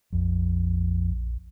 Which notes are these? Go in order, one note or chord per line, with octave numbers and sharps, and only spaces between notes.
A#1 F2